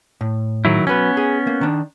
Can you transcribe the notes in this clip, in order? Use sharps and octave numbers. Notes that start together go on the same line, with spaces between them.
A2
D#3 F#3 E4
F#3 B3 C#4 B4
G#4
A#3
D#3 D4